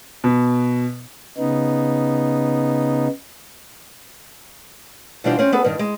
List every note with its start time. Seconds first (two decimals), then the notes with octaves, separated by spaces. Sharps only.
0.24 B2
1.37 C#3 B3 D#4
5.24 B2 E3 G3 D4 F4 C5
5.39 C4 C#4
5.52 B3 G#4 A4 B4
5.65 G2 D#3
5.79 G#3